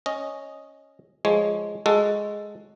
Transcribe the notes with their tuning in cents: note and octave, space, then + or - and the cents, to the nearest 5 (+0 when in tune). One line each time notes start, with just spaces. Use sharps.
C#4 +0 D#5 +0
F3 +0 G#3 +0 C#5 +0
G#3 +0 F#4 +0 A4 +5